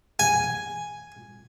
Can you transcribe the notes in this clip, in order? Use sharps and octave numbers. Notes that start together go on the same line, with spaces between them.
G#5